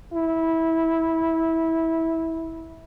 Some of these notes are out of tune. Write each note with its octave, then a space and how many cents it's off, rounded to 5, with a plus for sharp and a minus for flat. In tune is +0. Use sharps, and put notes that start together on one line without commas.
E4 -15